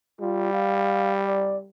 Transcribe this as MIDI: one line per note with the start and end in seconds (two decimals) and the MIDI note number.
0.21 1.69 55
0.21 0.50 65
0.53 1.13 77
1.25 1.57 74